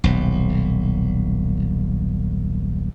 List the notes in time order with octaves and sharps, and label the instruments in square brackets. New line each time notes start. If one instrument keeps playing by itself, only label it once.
[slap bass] D#1 B1